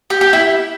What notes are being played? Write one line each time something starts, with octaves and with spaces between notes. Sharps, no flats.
G4
G4
E4